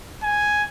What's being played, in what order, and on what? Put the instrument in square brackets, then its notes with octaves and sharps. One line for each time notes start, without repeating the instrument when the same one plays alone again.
[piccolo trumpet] G#5